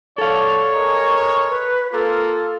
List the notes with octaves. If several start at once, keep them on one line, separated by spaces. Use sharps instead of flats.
D3 D4 A4 C#5 F5
G#3 A#4
B4
A#3 F4 A4